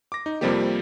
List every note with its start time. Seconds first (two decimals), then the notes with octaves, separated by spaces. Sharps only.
0.12 D6 A#6
0.26 D#4
0.41 F2 C3 F3 G3 A#3 G4